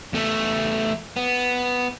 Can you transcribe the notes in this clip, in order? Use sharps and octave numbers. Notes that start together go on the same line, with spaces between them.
E2 A3
B3